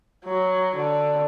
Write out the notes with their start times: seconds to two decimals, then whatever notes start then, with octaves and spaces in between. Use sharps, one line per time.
0.24 F#3
0.76 D3